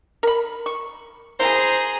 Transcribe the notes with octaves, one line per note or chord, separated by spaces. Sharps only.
A#4 B5
C#6
A#3 E4 G#4 C5 A#5